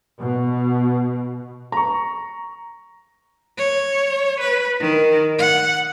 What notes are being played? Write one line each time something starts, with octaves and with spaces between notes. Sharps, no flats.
B2
A#5 C#6
C#5
B4
D#3
F#5